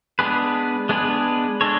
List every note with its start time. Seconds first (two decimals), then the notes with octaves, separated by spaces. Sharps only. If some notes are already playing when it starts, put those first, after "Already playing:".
0.19 G#3 B3 D4 G#4 B4
0.89 G#3 B3 D4 G#4 B4
1.61 G#3 D4 A4 C#5